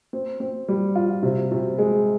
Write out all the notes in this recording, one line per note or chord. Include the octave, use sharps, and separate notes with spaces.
C4
C4
G3
F4
C3
C3
G#3